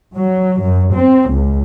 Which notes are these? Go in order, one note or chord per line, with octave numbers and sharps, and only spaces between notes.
F#3
F#2
C4
C#2